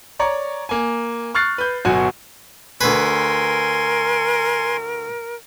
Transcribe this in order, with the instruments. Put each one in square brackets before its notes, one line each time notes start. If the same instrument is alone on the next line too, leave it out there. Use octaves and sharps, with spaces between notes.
[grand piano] C#5 D5 A#5 C#6
A#3 G#5
C#6 F6 F#6 A6 C7
B4 G6
G1 B2 F#3 F#4 G#5
[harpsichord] D2 B4 [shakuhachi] A#4 [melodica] G#5 C6